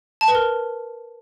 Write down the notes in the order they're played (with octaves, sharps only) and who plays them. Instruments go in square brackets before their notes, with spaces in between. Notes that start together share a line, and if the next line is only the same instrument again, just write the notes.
[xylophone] A5
B4
A#4